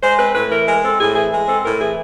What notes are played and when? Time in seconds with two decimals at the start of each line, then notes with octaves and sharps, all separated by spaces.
0.02 G#3 C5
0.19 C4 B4
0.35 A2 B4
0.51 E3 A#4
0.67 G#3 A#4
0.84 C4 A4
0.99 A2 G#4
1.15 E3 G#4
1.32 G#3
1.47 C4 A4
1.64 A2 A#4
1.81 E3 G#4